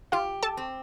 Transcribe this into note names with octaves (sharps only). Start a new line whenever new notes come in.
F4 G4 F5
A4 A5
C4